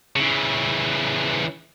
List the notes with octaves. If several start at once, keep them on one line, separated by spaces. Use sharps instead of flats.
C#3 E3